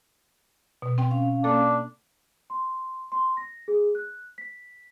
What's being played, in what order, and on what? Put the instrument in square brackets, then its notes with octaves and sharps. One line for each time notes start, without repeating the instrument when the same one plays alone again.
[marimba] B2
C4 G5 C6
[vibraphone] C#4 F5
[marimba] A#3 A4 [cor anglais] D4
[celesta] C6
C6
A#6
G#4
F#6
B6